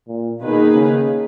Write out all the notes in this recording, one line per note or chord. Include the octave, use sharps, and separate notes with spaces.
A#2
B2 D#3 A#3 D#4 G#4 B4
C#3